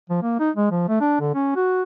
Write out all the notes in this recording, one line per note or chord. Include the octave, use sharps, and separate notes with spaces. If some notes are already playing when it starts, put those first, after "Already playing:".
F3
A#3
D#4
G#3
F3
A3
D4
D3
C#4
F#4